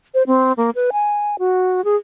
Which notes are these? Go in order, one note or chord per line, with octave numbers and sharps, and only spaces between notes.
C5
C4
A#3
B4
G#5
F#4
G#4